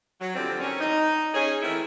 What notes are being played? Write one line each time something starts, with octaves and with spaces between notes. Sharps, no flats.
F#3
D3 F3 G3 C4
D#3 C4 C#4
D#4
C#4 G#4
D#3 E3 A3 C4 E4